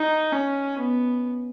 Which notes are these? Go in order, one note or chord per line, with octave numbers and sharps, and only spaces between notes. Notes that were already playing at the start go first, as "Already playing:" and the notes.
Already playing: D#4
C#4
B3